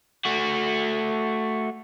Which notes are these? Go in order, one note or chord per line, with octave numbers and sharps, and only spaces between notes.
A3 F#4